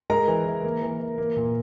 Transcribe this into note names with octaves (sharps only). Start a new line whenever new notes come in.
G#3 A#4 A#5
E3
E3
A#3
E3
E3
A#3
A#2